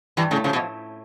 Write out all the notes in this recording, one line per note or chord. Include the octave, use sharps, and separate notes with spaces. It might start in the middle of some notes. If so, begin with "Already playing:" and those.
G2 E3 G3
A2 C#3 A3
C#3 F3
B2